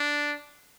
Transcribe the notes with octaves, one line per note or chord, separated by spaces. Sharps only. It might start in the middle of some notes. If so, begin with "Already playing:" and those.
Already playing: D4